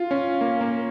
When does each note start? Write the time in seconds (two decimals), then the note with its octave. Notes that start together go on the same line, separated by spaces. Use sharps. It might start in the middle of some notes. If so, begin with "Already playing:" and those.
Already playing: F4
0.11 C#4
0.41 A#3
0.61 A#3